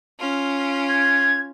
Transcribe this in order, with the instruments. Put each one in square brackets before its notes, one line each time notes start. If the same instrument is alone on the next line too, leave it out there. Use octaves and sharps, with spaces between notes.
[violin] C#4 F4
[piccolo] G#6